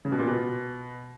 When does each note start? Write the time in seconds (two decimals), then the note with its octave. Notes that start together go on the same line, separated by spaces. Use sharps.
0.05 C#3
0.12 B2
0.19 A#2
0.27 B2